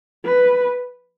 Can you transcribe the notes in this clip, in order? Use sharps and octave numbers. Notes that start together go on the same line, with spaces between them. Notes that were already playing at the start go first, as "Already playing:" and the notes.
B4